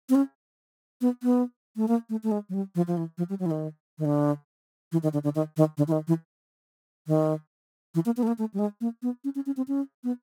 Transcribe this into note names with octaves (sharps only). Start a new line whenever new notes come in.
C4
C#4
B3
B3
A3
A#3
A3
A3
G#3
F#3
G3
F3
F3
E3
F3
G3
F#3
E3
D#3
D#3
D3
E3
D#3
D3
D3
D#3
D#3
D3
E3
D#3
E3
D#3
E3
A#3
B3
A3
A#3
A3
G3
G#3
A#3
B3
C#4
C#4
C#4
C4
C#4
B3